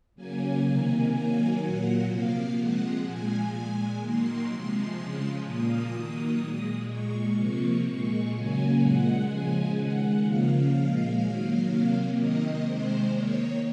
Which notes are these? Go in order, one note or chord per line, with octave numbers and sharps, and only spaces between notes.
C#3 F#3 A#3 G#5
C3 D#3 A#3
D#3 F#3 A#3 G#5
A#2 F#3 A#3 F#5
C3 F3 A#3 F5
C3 F3 G#3 F#5
A#2 F3 G#3 G#5
A#2 G#3
D#3 F#3 A#3 C6
C3 F3 G#3
C#3 F3 G#3
A#2 F3 A#3 D#6
D#3 F#3 A#3
A#2 G#3
A#2 G#3 C#6
C3 F3 A#3
A#2 G#3 C#6
C#3 F#3 A#3 G#5
A#2 G#3 F#5
C#3 F3 G#3 G#5
D#3 G#3 F#5
C#3 F3 A#3 F5
A#2 F3 G#3
D#3 F#3 A#3
C3 F#3 A#3
C3 D#3 A#3 D#5
C3 D#3 G#3 C5
D#3 A#3 C#5